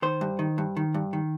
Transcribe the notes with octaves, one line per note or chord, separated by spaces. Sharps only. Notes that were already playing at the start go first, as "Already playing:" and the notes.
D#3 C5
G2
D#3
G2
D#3
G2
D#3